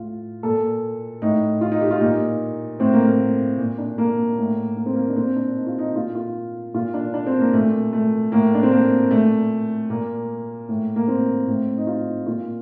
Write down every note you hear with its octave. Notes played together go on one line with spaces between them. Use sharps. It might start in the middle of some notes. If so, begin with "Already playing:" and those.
Already playing: A2 F4
A#2 A4
A2 D#4
F4
D#4
G4
F4
A#2 D#4
A2 C4
A#3
A#3
A#2
D4
A#3
A2
A#3
C4
A#3
D4
A#2 C4
D4
D#4
F4
D#4
A#2 F4
F4
A#2 F4
D4
D4
C4
A#3
A#2 A3
A3
A2 A#3
D4
C4
A#3
A#2 A3
A#2 A#3
A2
A#3
C4
A2
D#4
F4
A#2 F4